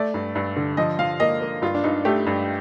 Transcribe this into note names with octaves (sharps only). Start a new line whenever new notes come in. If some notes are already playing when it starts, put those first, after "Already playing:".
Already playing: A3 D5
G2
G2
D3
F3 D#5
F3 F5
A#3 D#5
A#3
G2 F4
D4
G2 D#4
A3 G4
G2